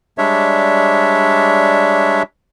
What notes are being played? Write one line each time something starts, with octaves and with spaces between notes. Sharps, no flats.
G3 G#3 D4 C#5 E5